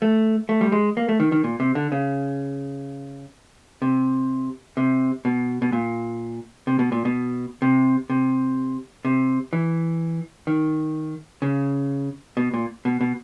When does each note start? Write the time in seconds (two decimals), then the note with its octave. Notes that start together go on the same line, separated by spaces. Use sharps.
0.02 A3
0.49 A3
0.61 G3
0.72 G#3
0.97 A#3
1.09 A3
1.20 D#3
1.32 D#3
1.44 A#2
1.60 C3
1.75 D3
1.92 C#3
3.82 C3
4.77 C3
5.25 B2
5.62 B2
5.72 A#2
6.67 C3
6.79 B2
6.92 A#2
7.05 B2
7.62 C3
8.10 C3
9.05 C3
9.53 E3
10.47 D#3
11.42 C#3
12.37 B2
12.54 A#2
12.85 B2
13.01 B2